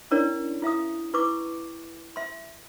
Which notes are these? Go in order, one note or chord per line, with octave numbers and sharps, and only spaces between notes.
C#4 D4 E4 A#4 C#5 D5
E4 E5 F5 D#6
E4 B4 C#6 D6
E5 C6